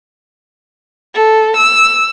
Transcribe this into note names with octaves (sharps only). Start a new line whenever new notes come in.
A4
E6